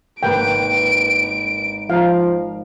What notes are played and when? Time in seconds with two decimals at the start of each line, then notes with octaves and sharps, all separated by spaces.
0.23 G#1 A#3 B4 G5 D7
1.90 F3 F5 A#5